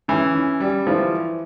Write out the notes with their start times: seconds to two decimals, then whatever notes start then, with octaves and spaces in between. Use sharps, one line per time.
0.08 E3 C#4
0.35 C#4
0.60 G3
0.87 E3 F3